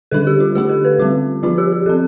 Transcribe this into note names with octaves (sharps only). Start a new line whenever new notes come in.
D3 G3 D4 A4
G4
F4
D3 A3 D4 G4
A4
B4
D3 G3 C4 F4
F3 B3 D4 F4
G4
G4
F3 C4 A4